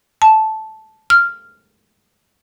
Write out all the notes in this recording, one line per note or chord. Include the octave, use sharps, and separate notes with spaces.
A5
F6